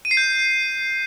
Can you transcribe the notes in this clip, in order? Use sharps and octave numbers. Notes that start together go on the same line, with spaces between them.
D#7
C7
G6